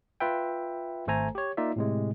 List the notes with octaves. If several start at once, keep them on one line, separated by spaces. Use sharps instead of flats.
F4 B4 E5 G5
G#1 A3 A4 C5 G#5 A#5
G4 C#5
A#3 D#4 F4 D5 E5
A2 C3 G#3